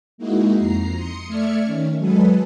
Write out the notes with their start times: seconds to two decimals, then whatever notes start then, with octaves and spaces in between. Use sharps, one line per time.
0.18 G#3 A#3 D#4 E4 F#4
0.56 F2 A#5 C7
0.95 C6 D#6 C#7
1.28 A3 D5 E5 F6 G#6 C#7
1.64 D#3 C#4
1.98 F#3 G#3 G#4 A4 B4